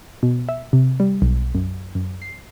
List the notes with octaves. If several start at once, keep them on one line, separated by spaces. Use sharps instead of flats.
B2
E5
C3
G3
B1
F#2
F#2
C7